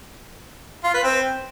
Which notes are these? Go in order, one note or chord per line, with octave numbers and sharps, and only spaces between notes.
F4
B4
C4